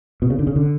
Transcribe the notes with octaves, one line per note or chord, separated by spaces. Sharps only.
B2
C#3
D3
C#3
D3